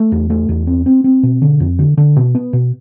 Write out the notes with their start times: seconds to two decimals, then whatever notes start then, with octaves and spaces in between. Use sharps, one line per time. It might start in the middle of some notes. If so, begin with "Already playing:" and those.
Already playing: A3
0.12 E2
0.30 A3
0.49 E2
0.67 C4
0.86 C4
1.04 C4
1.23 B2
1.42 D3
1.60 F2
1.79 D3
1.97 D3
2.16 B2
2.35 B3
2.53 B2